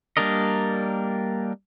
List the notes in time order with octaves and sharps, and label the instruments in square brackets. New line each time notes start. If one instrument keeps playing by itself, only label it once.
[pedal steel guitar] G3 A#3 D4 A#4 D#5